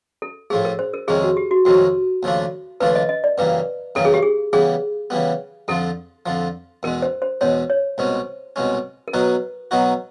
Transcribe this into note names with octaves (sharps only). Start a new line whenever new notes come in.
A4
A2 F3 A3 G#4
A#4
C5
A#4
F2 C3 D#3 G#3 C#4 G#4
F#4
G4
F#4
F2 C3 D#3 G#3 C#4 F#4
D#2 C#3 F3 A3 D4
D#2 C#3 F3 A3 D4 B4
D#5
D#5
D5
F#2 C#3 E3 G3 A#3 B4
F#2 C#3 E3 G3 A#3 A4
G#4
G4
G#4
C#3 E3 G3 B3 G#4
C#3 E3 G3 B3
F2 D3 F3 A4
F2 D3 F3
E2 B2 G#3 A#4
C5
C5
E2 B2 G#3 C#5
C#5
C2 B2 G#3 C#4 C5
C2 B2 G#3 C#4
A#4
B2 F#3 B3 D#4 F#4 B4
B2 F#3 B3 D#4 F#4